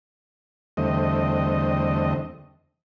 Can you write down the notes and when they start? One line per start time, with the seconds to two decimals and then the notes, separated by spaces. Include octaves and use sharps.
0.77 E2 D3 G3 A3 C4 D#5